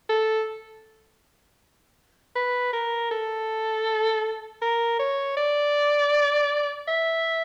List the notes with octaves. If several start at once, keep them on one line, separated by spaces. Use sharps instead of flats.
A4
B4
A#4
A4
A#4
C#5
D5
E5